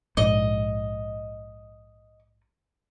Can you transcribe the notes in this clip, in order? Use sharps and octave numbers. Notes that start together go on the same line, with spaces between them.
A#1 G#2 D#5